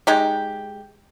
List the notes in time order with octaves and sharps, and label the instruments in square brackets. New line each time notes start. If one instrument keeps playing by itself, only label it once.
[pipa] G#3 D#4 G4